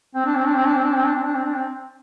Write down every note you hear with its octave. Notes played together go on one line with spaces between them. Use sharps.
C4
D4
C4
D4
C4
D4
C4
D4
C4
D4
C4
D4
C4
D4
C4